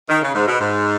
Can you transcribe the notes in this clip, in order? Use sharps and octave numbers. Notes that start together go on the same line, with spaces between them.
D#3
C#3
G#2
B2
G#2